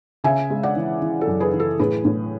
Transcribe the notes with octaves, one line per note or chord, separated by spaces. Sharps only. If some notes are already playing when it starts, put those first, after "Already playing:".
C#3 E5 G#5
G#3
D5 F#5
E3
E3
A4
F#2
G#4 B4
E3
A4
A2 G#4 B4
A2